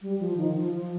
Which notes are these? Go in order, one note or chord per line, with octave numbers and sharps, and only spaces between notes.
G3
F3
D#3
F3
F3